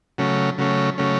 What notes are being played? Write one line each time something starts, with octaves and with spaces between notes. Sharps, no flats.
C#3 F#3 A3 C#4
C#3 F#3 A3 C#4
C#3 F#3 A3 C#4